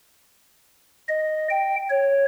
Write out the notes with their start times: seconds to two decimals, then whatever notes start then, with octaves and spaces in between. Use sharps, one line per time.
1.08 D#5
1.50 G5
1.89 C#5